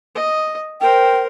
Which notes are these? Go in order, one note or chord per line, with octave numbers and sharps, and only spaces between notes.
D#5
A#4 C5 G5